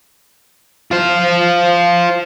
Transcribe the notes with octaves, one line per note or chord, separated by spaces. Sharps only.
F4 C5